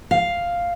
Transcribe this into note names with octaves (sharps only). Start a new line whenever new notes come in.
F5